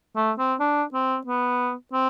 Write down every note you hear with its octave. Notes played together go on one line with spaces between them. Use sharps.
A3
C4
D4
C4
B3
C4